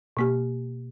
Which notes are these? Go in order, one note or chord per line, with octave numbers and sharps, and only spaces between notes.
B2 A#3 G4